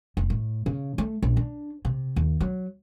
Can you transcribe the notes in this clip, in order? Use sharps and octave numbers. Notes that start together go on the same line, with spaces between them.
F1
A2
C#3
A3
A#1
D4
C3
D#2
F#3